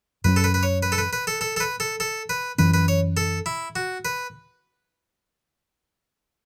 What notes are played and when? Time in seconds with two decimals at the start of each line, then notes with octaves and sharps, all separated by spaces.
0.24 F#2 F#3 A3 C#4 B4
0.36 A4
0.44 B4
0.54 B4
0.63 C#5
0.83 B4
0.92 A4
0.98 B4
1.13 B4
1.27 A4
1.41 A4
1.56 A4
1.60 B4
1.80 A4
2.00 A4
2.29 B4
2.58 F#2 E3 C#4 B4
2.74 B4
2.88 C#5
3.17 A4
3.46 E4
3.76 F#4
4.05 B4